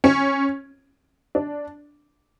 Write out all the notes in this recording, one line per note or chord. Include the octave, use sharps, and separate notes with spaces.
C#4
D4